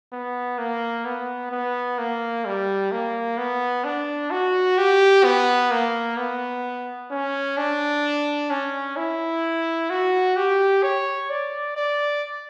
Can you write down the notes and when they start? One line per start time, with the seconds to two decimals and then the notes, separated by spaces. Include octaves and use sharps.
0.13 B3
0.58 A#3
1.05 B3
1.52 B3
1.98 A#3
2.45 G3
2.92 A#3
3.38 B3
3.84 D4
4.31 F#4
4.78 G4
5.24 B3
5.71 A#3
6.17 B3
7.11 C#4
7.57 D4
8.50 C#4
8.97 E4
9.90 F#4
10.37 G4
10.83 C#5
11.30 D5
11.77 D5